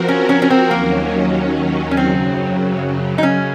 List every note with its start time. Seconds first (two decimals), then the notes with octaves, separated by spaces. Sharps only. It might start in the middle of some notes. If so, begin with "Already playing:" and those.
Already playing: F3 C4 F#4 A#4
0.08 C#4
0.29 C#4
0.42 C#4
0.50 C4
0.71 D#2 D#3 F#3 A#3 C#4
1.91 C#4
1.97 F#2 C#3 F#3 C4
3.18 D#4
3.23 C#3 C#4